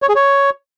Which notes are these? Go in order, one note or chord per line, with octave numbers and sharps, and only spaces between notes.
C#5
G#4
C#5